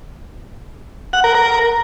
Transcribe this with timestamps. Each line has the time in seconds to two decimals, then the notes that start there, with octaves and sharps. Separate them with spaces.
1.13 F#5
1.24 A#4
1.35 A#4